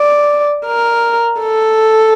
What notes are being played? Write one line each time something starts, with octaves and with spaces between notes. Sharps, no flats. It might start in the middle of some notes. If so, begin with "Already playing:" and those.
Already playing: D5
A#4
A4